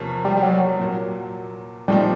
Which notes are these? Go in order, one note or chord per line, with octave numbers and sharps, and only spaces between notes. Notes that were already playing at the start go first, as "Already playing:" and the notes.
Already playing: E2 C3 F3 A#3 C#4
G3
G3
F#3
A#2 F#3 A#3
A#2 F3 G3 A3 C4 D#4